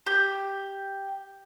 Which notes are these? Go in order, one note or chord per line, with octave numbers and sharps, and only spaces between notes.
G4